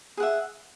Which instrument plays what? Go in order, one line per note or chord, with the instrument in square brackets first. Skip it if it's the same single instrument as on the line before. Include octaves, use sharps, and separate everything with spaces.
[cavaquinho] G#4
F#5
E5